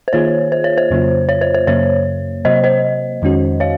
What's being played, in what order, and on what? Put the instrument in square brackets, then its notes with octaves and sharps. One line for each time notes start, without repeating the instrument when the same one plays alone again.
[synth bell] C5
[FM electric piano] D#3 A#3 F4 G#4 [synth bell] C#5
[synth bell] C5
C#5
C5
[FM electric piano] F2 C#3 F#3 A#3 F4
[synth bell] C#5
C5
C5
[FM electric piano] F#2 C#3 F#3 A#3 [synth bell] C#5
[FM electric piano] C3 F#3 A#3 [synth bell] C5 D#5
[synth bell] C5 D#5
[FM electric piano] F2 D#3 G#3 C#4 F#4
[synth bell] C#5 F5